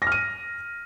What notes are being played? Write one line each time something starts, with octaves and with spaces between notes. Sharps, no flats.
F6 A#6 D#7